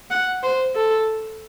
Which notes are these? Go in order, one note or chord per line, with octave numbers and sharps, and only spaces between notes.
F#5
C5
A4